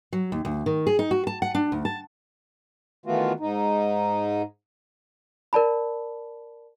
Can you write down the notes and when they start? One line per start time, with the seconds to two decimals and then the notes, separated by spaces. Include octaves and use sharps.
0.13 F#3
0.32 D#2
0.45 D2
0.66 D#3
0.87 G#4
0.99 D#4
1.11 F#4
1.27 A5
1.42 F#5
1.55 D4
1.72 D2
1.85 A5
3.06 D#3 E3 A3 B3 F4 F#4
3.40 G#2 D#4
5.53 A#4 D5 A5 B5